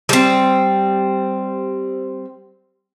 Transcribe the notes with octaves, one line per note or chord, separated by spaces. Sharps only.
G3 C4